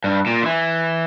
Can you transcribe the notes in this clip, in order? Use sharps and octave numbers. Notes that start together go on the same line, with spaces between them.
G2
A#2
D3
E3